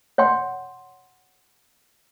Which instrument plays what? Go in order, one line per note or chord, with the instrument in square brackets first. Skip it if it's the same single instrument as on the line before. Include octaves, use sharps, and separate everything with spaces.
[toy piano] C#5 F#5 G5 C6